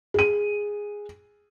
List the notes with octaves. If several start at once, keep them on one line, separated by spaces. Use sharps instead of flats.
G#4 D#7